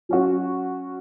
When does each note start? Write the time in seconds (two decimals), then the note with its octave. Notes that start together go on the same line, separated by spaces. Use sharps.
0.09 F#3 C#4 F#4